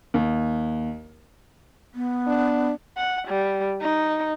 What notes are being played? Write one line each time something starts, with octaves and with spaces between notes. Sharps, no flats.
D#2
B3
D4
F#5
G3
D#4